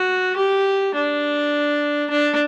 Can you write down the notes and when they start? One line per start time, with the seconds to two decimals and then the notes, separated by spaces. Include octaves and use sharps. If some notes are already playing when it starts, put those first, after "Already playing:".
Already playing: F#4
0.37 G4
0.95 D4
2.10 D4